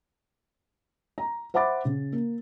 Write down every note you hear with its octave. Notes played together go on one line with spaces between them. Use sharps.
A#5
C5 E5 F#5 B5 D6 A6
C#3
A#3